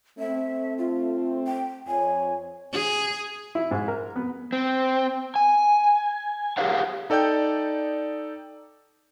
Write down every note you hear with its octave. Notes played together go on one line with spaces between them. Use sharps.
A3 C4 E5
F4
G5
F2 C#5 G#5
G#4
E4
G#2
A#4
B3
C4
G#5
G4 G#4 A#4 C#5 F5 F#5
D#4 A4 D5 G5 G6